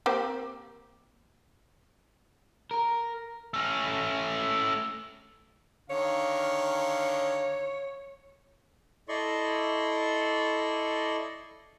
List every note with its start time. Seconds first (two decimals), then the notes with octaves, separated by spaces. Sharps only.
0.06 A#3 C4 G4
2.71 A#4
3.54 A3 C#4
5.90 D3 D#3 C#5 F5
9.09 E4 A4 D5 D#5 C6 C#6